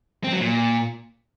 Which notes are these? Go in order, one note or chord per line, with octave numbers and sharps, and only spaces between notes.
C4
F#3
A#2